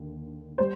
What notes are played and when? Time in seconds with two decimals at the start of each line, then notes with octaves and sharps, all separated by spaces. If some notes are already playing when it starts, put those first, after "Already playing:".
Already playing: D#2 D3
0.58 G3 C5